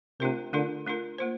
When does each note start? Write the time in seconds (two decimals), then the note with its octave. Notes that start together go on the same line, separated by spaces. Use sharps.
0.20 C3 A3 D4 F4 A#4
0.53 D3 A3 D4 F4 A#4
0.86 A3 D4 F4 A#4
1.18 A#3 F4 C5